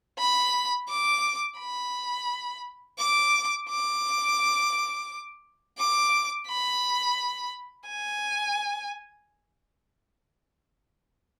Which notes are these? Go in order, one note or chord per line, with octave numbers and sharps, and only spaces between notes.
B5
D6
B5
D6
D6
D6
B5
G#5